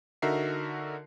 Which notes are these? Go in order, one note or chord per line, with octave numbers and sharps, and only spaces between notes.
D3 D#4 F#4 A#4 E5 C7